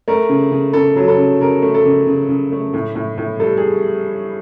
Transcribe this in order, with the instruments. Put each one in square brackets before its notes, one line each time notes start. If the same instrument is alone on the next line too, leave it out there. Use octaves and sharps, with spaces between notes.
[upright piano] A3 A#4
C#3
C#3
C#3 A4
F#3
A4
C#3
C#3 A#4
A3
A4
C#3
C#3
C#3
A3
A2
A2
A2
G3 A4
G#4